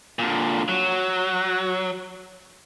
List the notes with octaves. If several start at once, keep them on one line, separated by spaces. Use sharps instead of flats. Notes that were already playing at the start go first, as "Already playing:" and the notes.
A#2 D3
F#3